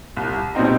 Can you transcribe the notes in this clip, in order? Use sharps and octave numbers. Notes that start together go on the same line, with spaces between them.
C2
B2 G3 C4 D#4